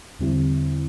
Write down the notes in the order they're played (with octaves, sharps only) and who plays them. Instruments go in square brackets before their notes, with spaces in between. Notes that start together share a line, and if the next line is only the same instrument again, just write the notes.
[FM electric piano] E2 D3 G3 C4 E4